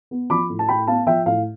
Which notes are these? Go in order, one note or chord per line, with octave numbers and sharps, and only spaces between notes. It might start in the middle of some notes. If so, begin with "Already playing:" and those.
B3
F3 B5 D6
A2
A5
A2 G5 B5
B3 F5 A5
F3 E5 G5
A2 F5